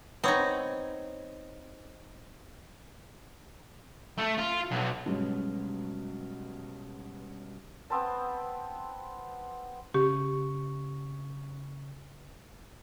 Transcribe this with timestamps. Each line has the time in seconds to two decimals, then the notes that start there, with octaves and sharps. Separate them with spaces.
0.24 B3 C4 D#4 C#5
4.18 A3
4.38 F4
4.71 B1
5.06 G2 B2 F#3 G#3 C#4
7.90 B3 C4 C5 A5
9.94 C#3 G4 C#6